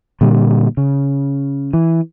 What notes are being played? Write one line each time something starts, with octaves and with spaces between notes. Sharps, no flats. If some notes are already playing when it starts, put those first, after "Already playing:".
A#2 D3 G3
C#3
E3